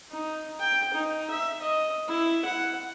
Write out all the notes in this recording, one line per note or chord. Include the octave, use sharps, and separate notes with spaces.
D#4
G5
D#4
E5
D#5
E4
F#5